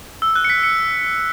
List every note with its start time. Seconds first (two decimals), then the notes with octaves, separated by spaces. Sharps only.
0.22 E6
0.36 F#6
0.44 C#7
0.50 B6
0.63 C#7